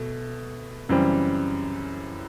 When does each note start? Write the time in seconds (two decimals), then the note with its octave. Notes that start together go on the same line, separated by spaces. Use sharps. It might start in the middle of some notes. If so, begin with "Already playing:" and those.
Already playing: B2 A3
0.89 F#2 C#3 E3 G3 C4